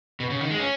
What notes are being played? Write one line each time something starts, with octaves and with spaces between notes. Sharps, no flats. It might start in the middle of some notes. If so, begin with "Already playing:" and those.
B2
C#3
D#3
G#3
C#4